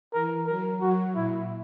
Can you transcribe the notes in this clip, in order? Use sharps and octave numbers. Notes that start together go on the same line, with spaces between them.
E3 A#4
F#3 A#4
F#3 F#4
A#2 E4